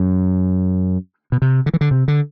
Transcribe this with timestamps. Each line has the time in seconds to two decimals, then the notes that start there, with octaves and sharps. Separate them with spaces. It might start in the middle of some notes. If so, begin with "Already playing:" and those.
Already playing: F#2
1.32 B2
1.42 C3
1.66 D3
1.74 E3
1.81 D3
1.91 C3
2.08 D3